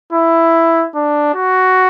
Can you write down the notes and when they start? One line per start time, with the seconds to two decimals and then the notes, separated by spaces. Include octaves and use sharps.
0.13 E4
0.94 D4
1.35 F#4